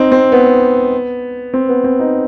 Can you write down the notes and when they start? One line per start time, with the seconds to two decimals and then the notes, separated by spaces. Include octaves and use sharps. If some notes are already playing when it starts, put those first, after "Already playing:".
Already playing: C4 D#4
0.12 C4
0.32 B3
1.54 C4
1.69 B3
1.84 C4
2.00 D#4